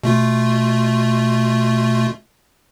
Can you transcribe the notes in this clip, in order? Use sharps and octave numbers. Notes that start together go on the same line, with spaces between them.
B2 A3 F4